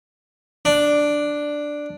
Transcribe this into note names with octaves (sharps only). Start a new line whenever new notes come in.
D4